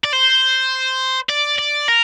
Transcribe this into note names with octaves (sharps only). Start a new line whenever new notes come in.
D5
C5
D5
D5
A#4